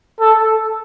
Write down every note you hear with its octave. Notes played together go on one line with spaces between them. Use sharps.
A4